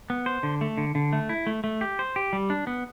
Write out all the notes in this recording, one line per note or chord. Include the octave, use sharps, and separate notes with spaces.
B3
C5
D3
A3
D3
D3
A3
E4
A3
A3
G4
C5
G4
G3
D4
B3